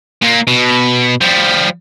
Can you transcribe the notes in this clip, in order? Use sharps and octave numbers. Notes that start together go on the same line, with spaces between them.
A#2 A#3
B2
F3 G3